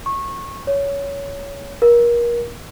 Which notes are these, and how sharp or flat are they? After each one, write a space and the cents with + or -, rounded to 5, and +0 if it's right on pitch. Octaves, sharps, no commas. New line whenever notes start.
C#6 -20
C#5 +15
A#4 +30